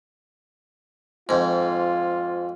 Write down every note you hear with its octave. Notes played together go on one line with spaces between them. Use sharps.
F2 G#2 F4